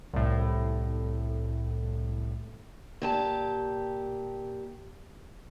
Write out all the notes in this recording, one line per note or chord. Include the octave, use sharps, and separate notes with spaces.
C2 A2
A#2 G4 A5